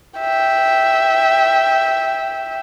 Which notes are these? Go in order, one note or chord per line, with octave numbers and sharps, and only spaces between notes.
E5 G5